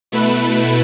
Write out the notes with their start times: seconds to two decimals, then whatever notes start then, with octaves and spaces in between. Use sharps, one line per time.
0.12 B2 A3 E4 B4